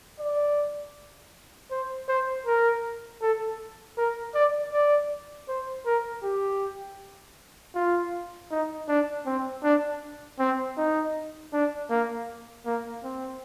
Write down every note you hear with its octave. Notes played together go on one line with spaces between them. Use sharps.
D5
C5
C5
A#4
A4
A#4
D5
D5
C5
A#4
G4
F4
D#4
D4
C4
D4
C4
D#4
D4
A#3
A#3
C4